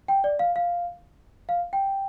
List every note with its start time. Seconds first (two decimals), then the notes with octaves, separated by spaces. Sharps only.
0.08 G5
0.24 D5
0.39 F5
0.56 F5
1.49 F5
1.73 G5